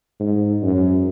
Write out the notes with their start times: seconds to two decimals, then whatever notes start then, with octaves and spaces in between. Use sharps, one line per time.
0.20 G#2
0.62 F#2